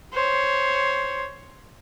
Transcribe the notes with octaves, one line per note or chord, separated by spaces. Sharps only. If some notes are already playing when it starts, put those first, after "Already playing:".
C5 C#5